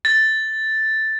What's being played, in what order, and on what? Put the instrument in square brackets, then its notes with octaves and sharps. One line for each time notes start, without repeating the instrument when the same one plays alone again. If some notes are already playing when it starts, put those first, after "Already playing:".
[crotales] A6